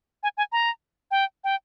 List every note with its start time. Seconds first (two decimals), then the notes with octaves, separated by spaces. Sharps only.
0.23 G#5
0.37 G#5
0.52 A#5
1.11 G5
1.44 G5